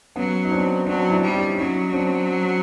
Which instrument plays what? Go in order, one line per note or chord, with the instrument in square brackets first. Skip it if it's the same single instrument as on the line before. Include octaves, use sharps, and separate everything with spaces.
[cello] F#3 [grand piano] B3 C#4
[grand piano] D#4
C4 D4
[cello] F#3 [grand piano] C4 D4
[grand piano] D4 E4
[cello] G3
[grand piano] C#4 D#4
[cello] F#3 [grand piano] C#4 D#4
[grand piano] C4 D4